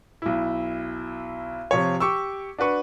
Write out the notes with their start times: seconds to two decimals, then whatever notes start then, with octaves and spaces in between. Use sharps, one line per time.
0.22 B1 E4
1.71 C3 F3 C#5
2.00 G4 C#6 D6 E6
2.58 D4 F#4 B4 C#6